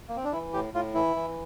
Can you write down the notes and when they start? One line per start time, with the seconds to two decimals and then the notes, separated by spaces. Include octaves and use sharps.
0.09 A#3
0.16 C4
0.24 D4
0.32 E3 E4
0.53 A2 G4
0.74 A2 F4
0.95 E3 E4
1.16 E3